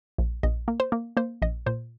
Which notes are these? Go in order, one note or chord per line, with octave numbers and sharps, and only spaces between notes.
A#1
A#1 D#5
A#3
C5
A#3
A#3 C5
A#1 D#5
A#2 C5